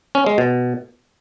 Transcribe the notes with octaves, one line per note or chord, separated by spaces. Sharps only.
C#4
G#3
B2